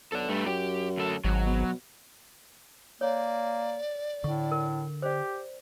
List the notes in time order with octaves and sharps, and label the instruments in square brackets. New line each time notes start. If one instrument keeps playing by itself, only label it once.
[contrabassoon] B1 [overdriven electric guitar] A4 D5
[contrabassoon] G2 [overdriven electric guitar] G3 A3
[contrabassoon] F#2 [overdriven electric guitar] G4
[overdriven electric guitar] D2 A4
[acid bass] G#1 [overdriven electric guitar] F#3
[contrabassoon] B2
[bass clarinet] A#3 [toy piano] C#5 [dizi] D5
[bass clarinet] A2 [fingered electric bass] D3 [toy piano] C#6
[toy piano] A#4
[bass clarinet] G4 [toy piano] C5 D5